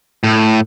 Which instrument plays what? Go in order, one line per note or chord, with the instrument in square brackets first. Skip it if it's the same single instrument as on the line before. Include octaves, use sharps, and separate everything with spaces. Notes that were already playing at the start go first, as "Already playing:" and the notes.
[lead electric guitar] A2